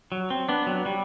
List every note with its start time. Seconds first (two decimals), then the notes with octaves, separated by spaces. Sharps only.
0.12 F#3
0.30 C4
0.49 B3 D4
0.67 F#3
0.86 G3